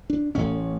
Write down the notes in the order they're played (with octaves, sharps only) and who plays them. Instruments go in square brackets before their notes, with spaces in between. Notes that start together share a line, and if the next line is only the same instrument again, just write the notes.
[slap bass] D4
A1 A2 C#4